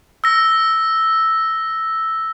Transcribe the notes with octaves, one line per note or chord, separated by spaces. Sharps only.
E6 A#6